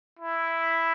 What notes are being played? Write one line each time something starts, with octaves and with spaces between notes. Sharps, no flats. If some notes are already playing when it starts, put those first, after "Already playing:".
E4